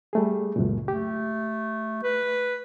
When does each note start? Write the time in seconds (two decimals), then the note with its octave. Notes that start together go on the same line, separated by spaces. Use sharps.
0.13 G3 A3 G#4
0.56 C#2 F#2 A#2
0.88 A3 G4
2.03 B4